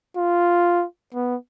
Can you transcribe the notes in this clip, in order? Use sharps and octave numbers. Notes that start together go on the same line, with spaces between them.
F4
B3